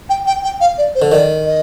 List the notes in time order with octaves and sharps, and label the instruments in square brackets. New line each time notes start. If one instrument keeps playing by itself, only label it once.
[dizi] G5
G5
G5
F5
D5
C5
[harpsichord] D3
[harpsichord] D#3 [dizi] D5
[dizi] D#5